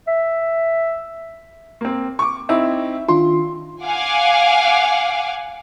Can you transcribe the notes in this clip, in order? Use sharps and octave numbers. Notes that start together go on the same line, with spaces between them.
E5
A#3 C4
C#6 D6
C4 D#4 E4 E5
D#3 D4 F4 C6
F5 F#5 G#5 D6